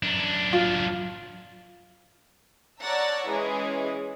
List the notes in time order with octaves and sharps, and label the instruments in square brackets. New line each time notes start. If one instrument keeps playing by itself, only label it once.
[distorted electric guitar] F#2 D4
[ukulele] F4
[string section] C#5 D5 F#5 A5 A#5 E6
E3 G#3 C#4 G#4